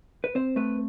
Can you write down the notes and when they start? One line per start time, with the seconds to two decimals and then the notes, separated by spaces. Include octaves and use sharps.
0.24 B4
0.35 C4 C5
0.56 A3 B4